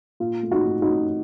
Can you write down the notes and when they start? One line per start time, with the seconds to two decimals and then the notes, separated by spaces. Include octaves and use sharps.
0.20 A#2 F4
0.43 A3
0.51 D#4 F#4
0.67 A3
0.82 D#4 F#4
0.90 A3